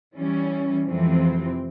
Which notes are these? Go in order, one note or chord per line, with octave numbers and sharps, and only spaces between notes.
E3 G3 C#4
F2 C3 E3 G#3 C4